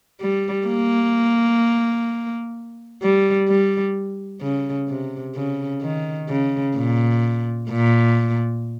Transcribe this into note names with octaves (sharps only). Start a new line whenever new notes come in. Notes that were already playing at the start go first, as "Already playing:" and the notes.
G3
A#3
G3
G3
C#3
C3
C#3
D#3
C#3
A#2
A#2